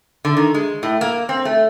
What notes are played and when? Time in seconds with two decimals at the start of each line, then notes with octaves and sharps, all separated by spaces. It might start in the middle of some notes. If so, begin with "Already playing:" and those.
0.25 D3
0.37 D#3
0.54 G#3
0.83 A2
1.01 A#3
1.29 C4
1.45 A3